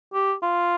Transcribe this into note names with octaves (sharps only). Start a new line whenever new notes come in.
G4
F4